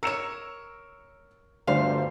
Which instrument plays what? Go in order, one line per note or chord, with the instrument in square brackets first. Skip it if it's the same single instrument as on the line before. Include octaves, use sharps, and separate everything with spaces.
[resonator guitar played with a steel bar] A#4 C#5 [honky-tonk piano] E6 C#7 E7
[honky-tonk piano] G1 G3 C5 [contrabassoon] D2 [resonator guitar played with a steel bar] F5